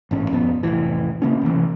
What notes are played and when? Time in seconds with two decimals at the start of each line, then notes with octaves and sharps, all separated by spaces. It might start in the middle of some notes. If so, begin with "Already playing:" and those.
0.11 A1 G#2 C#4
0.30 A#1 F2 F3 B3
0.63 F1 B1 A2 E3
1.22 C#3 A#3 C#4
1.42 A1 C3 E3